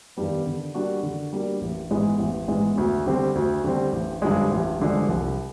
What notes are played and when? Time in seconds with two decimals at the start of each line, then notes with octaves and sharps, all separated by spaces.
0.17 G2 D#3 G3 B3
0.46 D3
0.74 G3 A#3 D4 F#4
1.03 D3
1.33 G3 A#3 D4 F#4
1.61 A1
1.91 G#2 E3 G#3 B3
2.19 A1
2.48 G#2 E3 G#3 B3
2.78 D2
3.06 D3 G3 C4
3.35 D2
3.64 D3 G3 C4
3.93 A1
4.22 G2 D3 F3 G#3
4.51 A1
4.80 G2 D3 F3 G#3
5.08 C2